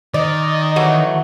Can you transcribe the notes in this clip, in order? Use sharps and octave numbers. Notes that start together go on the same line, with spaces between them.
D#3 D5 D#5
E3 F#3 A3